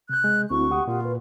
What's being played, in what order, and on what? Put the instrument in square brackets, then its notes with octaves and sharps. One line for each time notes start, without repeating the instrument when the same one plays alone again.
[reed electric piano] C3 G6 [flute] F#6
[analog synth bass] G#3
[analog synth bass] D2 [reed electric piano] C4 E4 F#4 [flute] C#6
[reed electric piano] G4 F#5 D#6
[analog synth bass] A#2 [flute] F4
[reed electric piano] B4